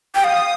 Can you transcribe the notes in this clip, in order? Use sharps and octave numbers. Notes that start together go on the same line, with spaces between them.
G5
F5 D#6